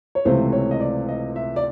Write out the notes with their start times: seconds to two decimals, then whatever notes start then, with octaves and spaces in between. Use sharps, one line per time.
0.15 C#5
0.25 C#2 C3 E3 A3 C4 C5
0.52 C#5
0.71 D#5
0.80 D5
1.08 D#5
1.36 E5
1.56 D5